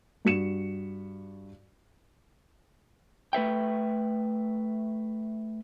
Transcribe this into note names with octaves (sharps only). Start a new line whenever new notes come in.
G2 F#4 C#7 E7
A3 B4 E5 G5